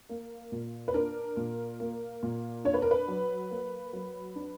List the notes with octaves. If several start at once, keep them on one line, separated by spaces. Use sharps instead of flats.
A#3
A#2
B4
D4 A#4
A#2
A#3
A#2
D4 C#5
B4
A#4
B4
F#3
A#3
F#3
D4